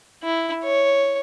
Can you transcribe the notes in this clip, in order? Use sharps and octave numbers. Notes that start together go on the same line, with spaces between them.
E4
C#5